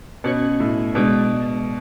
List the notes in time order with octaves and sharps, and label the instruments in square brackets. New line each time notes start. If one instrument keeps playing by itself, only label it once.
[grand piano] B2 [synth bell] C#4 F#4 C#5
[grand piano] A2
[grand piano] B2 [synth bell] G#3 D4 G#4 B4 D5